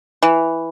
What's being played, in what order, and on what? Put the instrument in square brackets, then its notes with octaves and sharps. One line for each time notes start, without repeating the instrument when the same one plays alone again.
[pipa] E3